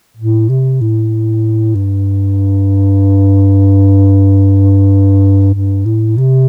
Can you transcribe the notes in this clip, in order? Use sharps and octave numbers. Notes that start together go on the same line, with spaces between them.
A2
C3
A2
G2
G2
A2
C3